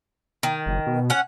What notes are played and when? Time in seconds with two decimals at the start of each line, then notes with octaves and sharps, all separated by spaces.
0.43 D#3
0.66 F#1
0.86 B2
1.10 C#4 F#5